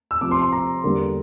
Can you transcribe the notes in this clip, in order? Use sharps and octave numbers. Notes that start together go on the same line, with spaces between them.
E6
C3 F3 C4 D6
C6
C6
A#5
E2 D3 G3 A#3